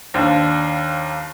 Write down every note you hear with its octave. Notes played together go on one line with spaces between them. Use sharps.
D#2 D4 C5 F5